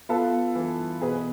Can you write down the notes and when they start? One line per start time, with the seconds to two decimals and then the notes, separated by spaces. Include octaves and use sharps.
0.09 B3 F4 A4
0.55 E3
1.01 B2 G#4 B4